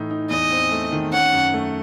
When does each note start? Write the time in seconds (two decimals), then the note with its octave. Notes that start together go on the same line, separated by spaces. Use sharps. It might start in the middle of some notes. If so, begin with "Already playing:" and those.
Already playing: A2 E3 D#4
0.11 D#4
0.31 E2 D#5
0.51 C4
0.72 A3
0.92 D#3
1.13 C#4 F#5
1.33 F#2
1.54 A3